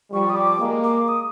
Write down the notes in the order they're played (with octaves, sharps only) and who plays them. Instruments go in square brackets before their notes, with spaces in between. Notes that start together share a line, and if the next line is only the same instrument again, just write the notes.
[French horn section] F3 G3 [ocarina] C#6
[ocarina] D#6
D6
[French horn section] G#3 A#3
[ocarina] D6
D#6